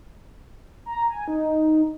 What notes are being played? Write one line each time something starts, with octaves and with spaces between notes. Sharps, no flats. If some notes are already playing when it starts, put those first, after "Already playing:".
A#5
G#5
D#4